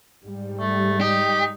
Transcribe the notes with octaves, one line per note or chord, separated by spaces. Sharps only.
G#2 G3
A3
D#4 G4